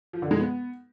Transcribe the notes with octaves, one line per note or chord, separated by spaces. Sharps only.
F3
D3
G#3
B3